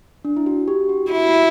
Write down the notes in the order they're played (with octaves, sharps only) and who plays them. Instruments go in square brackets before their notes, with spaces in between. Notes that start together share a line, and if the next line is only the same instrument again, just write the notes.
[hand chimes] D4
E4
F#4
G4
F#4
[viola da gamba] E4 [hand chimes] F#4